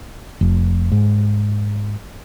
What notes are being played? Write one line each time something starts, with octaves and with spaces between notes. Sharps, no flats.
F1
G#2